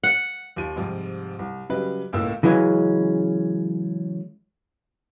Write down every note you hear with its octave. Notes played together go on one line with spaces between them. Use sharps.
F#5
D#2 F4 D#7
G#2 C3 F3 G3
C2
C#3 F#3 G3 B4 D#5
C#2 A2 A#3 E6
C#3 E3 F#3 G#3 C#4